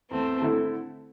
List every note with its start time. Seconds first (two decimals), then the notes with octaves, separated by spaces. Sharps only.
0.11 E2 A3 C4
0.42 D3 A3 E4 A4